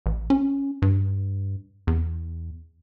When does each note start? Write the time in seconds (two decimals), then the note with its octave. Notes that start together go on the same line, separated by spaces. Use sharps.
0.06 A1
0.30 C#4
0.82 G2
1.87 E2